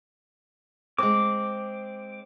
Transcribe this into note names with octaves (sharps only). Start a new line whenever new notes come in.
G#3 C4 D6